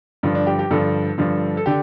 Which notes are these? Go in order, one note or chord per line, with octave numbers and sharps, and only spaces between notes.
G2 D3 F3
D4
G4
G4
G2 D3 F3 A4
G2 D3 F3
A4
D3 G4